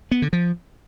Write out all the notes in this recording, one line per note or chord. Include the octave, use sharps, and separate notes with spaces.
B3
D3
F3